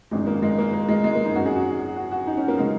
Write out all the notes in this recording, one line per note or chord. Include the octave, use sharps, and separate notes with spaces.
G#1 F#2 D#3 G#3
A#3
G#3
A#3
A#3
G#3
G#3
A#3
D#4
G#1 F#2 F#3 F#4
G#4
F#4
F#4
F#4
D#4
C#4
A#3
C#3 F#3 G#3